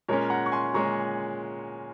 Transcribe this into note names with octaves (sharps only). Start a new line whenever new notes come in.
A#2 G#3 C#4 A#4 C#5
F#5 A#5
C#6
G#5 C6
A#2 G#3 C#4 A#5 C#6